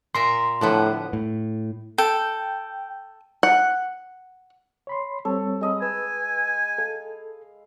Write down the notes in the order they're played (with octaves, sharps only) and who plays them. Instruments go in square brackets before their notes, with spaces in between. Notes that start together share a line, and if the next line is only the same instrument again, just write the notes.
[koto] A#2 A#4 E5 [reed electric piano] C6
[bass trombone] A2 [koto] D3 F3 B3
[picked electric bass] A2
[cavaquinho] A4 [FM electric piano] G5
[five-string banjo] F#5
[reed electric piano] C#5 B5 C6
[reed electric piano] G3 C4 C#5 [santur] A4
[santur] G#3 D#5 B5
[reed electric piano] B4 [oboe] G#5 [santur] E6
[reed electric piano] A4 [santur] F5